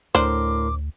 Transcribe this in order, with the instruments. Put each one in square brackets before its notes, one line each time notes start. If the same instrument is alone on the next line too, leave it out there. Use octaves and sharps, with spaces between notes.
[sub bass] D2 [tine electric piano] A2 A#4 C6 [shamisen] D4 C5 [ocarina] D6